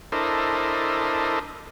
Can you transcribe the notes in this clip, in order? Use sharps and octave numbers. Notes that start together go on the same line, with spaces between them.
D4 E4 A4 A#4 C5 D#5